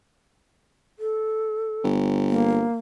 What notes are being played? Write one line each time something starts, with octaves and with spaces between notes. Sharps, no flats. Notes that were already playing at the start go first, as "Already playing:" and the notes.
A4
G1
A#3